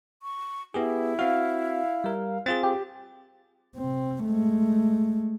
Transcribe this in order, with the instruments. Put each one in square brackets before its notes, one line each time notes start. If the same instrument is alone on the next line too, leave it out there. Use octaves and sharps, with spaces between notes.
[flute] C#6
[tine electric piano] B3 G4 G#4 [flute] E4
[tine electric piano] C4 F#4 [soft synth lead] F5
[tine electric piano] G3 A#4
[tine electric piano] C4 F4 G#4 [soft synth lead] A6
[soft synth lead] G4
[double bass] C3 C4
G#3 A3